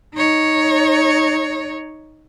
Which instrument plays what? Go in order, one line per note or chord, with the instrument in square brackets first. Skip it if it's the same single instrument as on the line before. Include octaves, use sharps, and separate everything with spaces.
[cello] D#4 C#5